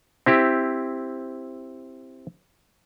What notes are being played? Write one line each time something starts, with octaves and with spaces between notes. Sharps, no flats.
C4 E4 G4